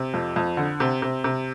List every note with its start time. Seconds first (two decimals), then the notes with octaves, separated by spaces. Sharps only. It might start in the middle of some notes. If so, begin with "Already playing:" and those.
Already playing: C3
0.14 F2
0.36 F2
0.57 D3
0.80 C3
1.02 C3
1.24 C3